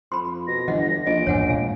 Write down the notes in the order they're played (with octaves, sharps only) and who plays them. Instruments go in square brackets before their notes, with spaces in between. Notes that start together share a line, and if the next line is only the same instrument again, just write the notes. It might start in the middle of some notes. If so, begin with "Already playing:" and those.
[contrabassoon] F2 [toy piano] B5 C6
[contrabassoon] B2 [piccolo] A#6
[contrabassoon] G1 [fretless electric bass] E3 [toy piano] D#5 F#5
[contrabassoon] A#1 [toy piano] D#5 [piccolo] D7
[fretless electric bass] A1 E2 G#2 [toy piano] C#5 F#5 G#5
[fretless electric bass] A#2 G#3 [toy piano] F5